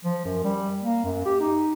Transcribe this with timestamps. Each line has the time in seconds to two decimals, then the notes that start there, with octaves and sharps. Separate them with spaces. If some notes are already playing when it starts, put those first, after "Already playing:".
0.05 F3
0.25 F#2
0.44 G3
0.83 A#3
1.04 F#2
1.26 G4
1.40 D#4